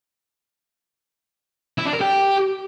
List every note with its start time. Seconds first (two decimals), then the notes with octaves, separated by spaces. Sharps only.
1.78 E4
1.86 D4
1.93 A#4
2.01 G4